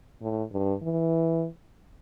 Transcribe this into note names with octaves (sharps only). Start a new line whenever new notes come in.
A2
G2
E3